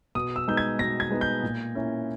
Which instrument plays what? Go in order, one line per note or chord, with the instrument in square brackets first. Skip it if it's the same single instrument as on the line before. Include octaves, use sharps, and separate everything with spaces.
[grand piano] B2 D#6
E6
G#3 B3 D#4 G6
G#6
B2 A#6
G#6
G#3 B3 D#4
G6
A#2
A#3 C#4 E4